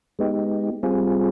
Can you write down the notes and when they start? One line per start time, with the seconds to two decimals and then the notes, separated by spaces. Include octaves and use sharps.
0.19 G#3 B3 D#4 G4
0.83 G3 C4 F4 G#4